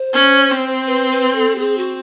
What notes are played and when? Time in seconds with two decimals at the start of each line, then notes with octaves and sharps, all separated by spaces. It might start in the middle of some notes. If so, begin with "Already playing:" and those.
Already playing: C5
0.13 C#4
0.50 C4
0.87 B4
1.11 B4
1.35 A4
1.55 G4
1.59 C4 G#4
1.78 F#4